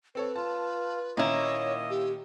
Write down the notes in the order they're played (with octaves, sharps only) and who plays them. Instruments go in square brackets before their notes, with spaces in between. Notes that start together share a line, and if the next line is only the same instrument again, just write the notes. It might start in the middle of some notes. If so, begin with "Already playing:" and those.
[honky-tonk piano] C4 A4 C#5 [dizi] B4
[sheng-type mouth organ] F4 [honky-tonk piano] A5
[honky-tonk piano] A#2 D#3 C#4 [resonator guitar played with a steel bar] A#3 E4 [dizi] C#5 [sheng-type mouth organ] D#5
[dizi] G4